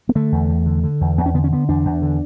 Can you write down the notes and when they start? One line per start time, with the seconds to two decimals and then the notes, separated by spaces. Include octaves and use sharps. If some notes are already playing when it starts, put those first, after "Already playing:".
0.09 B3
0.15 D3 A3
0.32 E2
0.49 E2
0.66 D3
0.83 D3
1.01 E2
1.18 E2 B3
1.26 C#4
1.34 D3 B3
1.44 C#4
1.52 D3 B3
1.69 E2 D4
1.85 E2
2.02 D3